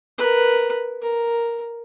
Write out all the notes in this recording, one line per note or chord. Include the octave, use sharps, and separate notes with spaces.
A#4 B4
A#4